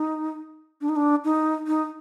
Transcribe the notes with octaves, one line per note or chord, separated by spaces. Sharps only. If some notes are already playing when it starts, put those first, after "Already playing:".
Already playing: D#4
D4
D#4
D4
D#4
D#4